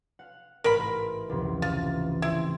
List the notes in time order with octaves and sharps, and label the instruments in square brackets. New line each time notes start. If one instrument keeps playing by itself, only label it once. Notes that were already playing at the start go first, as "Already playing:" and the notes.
[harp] F5 F#5
[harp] A1 G#2 [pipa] A#4 B5
[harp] F1 C#2 E3
[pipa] F4
[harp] C4 [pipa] E4